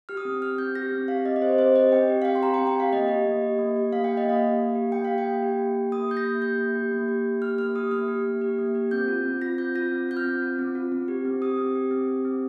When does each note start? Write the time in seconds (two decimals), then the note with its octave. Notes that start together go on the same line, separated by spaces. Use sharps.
0.09 G4 F6
0.17 D#6
0.25 C4
0.42 G4 F6
0.58 C4 G6
0.75 G4 A#6
0.92 C4
1.08 G4 F5
1.25 C4 D#5
1.36 D#5
1.42 G4 C5
1.58 C4 C5
1.76 G4 D#5
1.92 C4 G5
2.09 G4
2.22 F5
2.25 C4 G5
2.35 C6
2.42 G4 A#5
2.54 G5
2.58 C4
2.67 G5
2.76 G4 F5
2.93 A#3 D#5
3.08 G4
3.26 A#3
3.42 G4
3.59 A#3
3.76 G4
3.93 A#3 F5
4.04 G4 G5
4.17 D#5
4.25 A#3 F5
4.43 G4
4.59 A#3
4.75 G4
4.92 A#3 G5
5.04 G4 F5
5.18 G5
5.25 A#3
5.43 G4
5.58 A#3
5.75 G4
5.92 A#3 D#6
6.08 G4 G6
6.17 A#6
6.25 A#3
6.42 G4 G6
6.58 A#3
6.75 G4
6.92 A#3
7.08 G4
7.25 A#3
7.41 G4 F6
7.58 A#3 F6
7.76 G4 D#6
7.91 A#3 F6
8.08 G4
8.25 A#3
8.41 G4
8.58 A#3
8.75 G4
8.91 C4 G6
9.08 F4
9.25 C4
9.42 F4 A#6
9.58 C4 G6
9.75 F4 A#6
9.92 C4
10.09 F4 G6
10.17 F6
10.25 C4
10.42 F4
10.59 C4
10.75 F4
10.92 C4
11.08 G4
11.25 C4
11.42 G4 D#6
11.58 C4
11.75 G4
11.91 C4
12.09 G4
12.25 C4